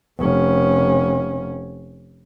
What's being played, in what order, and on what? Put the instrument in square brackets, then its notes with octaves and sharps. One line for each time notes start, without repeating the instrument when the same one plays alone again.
[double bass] F1 C#4